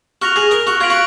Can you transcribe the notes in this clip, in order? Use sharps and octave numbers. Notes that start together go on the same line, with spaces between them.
F#4 F6 A#6 F7
G#4
A#4
F#4
F4 G#6 B6 D7 F#7
F#4